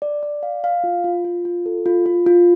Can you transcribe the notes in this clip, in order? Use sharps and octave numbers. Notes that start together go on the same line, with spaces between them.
D5
D5
F5
F5
F4
F4
F4
F4
A4
F4
F4
F4